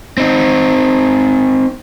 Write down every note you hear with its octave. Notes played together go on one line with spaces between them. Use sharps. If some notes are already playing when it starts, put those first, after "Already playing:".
C4 D#4